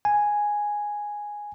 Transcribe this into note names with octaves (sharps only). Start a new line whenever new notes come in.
G#5